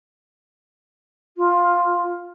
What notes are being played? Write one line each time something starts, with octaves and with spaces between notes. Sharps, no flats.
F4